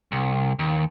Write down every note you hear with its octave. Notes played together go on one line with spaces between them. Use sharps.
C2
D#2